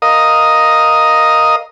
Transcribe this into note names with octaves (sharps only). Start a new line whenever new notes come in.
A#4 D#5 F5 D#6